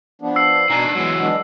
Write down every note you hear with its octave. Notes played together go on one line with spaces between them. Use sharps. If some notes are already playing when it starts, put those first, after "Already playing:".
F3 B3 D4
E6 C7
B2 D#3 D4 G#5 A#5
E3 F#3 G#3 B3
G#3 B3 D4